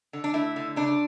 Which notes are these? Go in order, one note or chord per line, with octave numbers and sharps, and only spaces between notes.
D3
D4
A3 E4
D3
C#3 D4